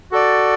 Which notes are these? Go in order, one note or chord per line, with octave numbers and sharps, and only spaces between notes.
F#4 A4 D5